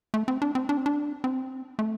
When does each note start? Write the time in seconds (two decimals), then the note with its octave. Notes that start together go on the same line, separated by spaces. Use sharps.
0.14 A3
0.28 C4
0.42 D4
0.55 C4
0.69 D4
0.77 C4
0.86 D4
1.24 C4
1.79 A3